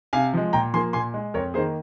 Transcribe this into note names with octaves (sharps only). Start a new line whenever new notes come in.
C3 F5 G#5
F3 G#3
A#2 G5 A#5
F3 A#3 G#5 C6
A#2 G#5 C6
G#3
F2 A#4 C#5
D#3 A#3 G#4 C5